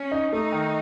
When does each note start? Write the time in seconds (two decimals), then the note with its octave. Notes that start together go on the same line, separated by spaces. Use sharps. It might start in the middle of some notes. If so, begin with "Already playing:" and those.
Already playing: C#4
0.12 D#4
0.32 A3 D#4
0.52 D#3